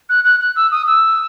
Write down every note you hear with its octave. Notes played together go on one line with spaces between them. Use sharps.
F#6
F#6
F#6
E6
D#6
E6